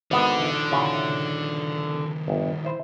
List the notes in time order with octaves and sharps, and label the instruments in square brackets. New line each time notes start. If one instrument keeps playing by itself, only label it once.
[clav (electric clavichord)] G#1 B3 [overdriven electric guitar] D3
[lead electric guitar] D#3 F3
[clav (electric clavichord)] C#3 E4 F#4
G1
E4 C5